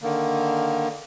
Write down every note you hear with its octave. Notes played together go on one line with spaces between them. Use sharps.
D3 D#3 A#3